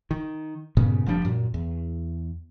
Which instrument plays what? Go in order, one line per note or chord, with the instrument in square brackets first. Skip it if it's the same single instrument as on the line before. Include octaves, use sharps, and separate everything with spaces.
[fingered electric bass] D#3
G2 A#2 C#3 B3
F1 F3 G3 D4
F#2 A#2
E2